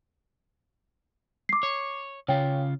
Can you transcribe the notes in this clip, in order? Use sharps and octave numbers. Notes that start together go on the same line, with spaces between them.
D6 C7
C#5
C#3 F4 C#5 G5